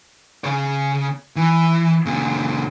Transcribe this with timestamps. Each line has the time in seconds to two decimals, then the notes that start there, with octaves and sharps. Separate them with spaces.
0.44 C#3 C#5
1.36 E3
2.06 A#2 C#3